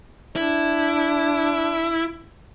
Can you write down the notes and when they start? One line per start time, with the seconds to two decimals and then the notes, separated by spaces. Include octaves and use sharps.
0.36 D4 E4